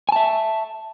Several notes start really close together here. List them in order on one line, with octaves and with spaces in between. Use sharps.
G#5 A5 E5